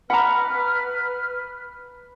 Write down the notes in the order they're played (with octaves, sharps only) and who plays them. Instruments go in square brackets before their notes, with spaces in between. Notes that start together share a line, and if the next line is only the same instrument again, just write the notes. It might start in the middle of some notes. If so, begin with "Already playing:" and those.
[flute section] B4 F6 [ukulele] F#5 A#5 [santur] B5 D6